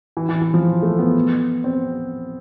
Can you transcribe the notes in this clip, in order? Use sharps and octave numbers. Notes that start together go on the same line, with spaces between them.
E3
E3
E3
F3
A3
B3
C4